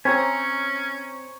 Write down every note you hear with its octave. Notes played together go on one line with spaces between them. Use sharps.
C4 C#4 C5 C#5 G#5 A#5